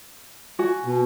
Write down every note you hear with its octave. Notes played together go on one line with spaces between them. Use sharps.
F#4 G#5
B2